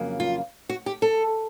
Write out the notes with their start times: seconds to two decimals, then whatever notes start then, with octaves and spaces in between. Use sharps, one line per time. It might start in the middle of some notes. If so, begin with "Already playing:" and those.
Already playing: F2 C#3 F#3 A#3
0.20 F4
0.69 F#4
0.86 G4
1.02 A4